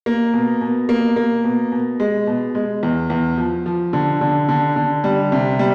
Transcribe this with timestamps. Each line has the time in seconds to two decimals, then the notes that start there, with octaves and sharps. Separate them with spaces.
0.06 A#3
0.34 B2
0.61 B2
0.89 A#3
1.16 A#3
1.44 B2
1.72 B2
2.00 G#3
2.27 B2
2.55 G#3
2.83 E2
3.10 E2
3.38 F3
3.66 F3
3.93 D3
4.21 D3
4.48 D3
4.76 D3
5.04 G3
5.32 C3
5.59 G3